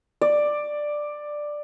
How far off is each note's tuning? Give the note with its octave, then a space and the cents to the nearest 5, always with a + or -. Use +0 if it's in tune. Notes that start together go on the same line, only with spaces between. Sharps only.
D5 +10